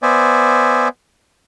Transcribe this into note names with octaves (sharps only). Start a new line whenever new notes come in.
B3 C5 D5 E5 G#5